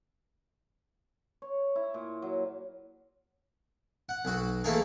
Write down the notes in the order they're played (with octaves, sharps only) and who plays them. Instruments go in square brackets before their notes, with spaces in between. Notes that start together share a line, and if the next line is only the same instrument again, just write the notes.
[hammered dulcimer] C#5
E4
A#2
F#3
[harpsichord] F#5
B1 F#4
E3 A3 A#3 D#4 G#4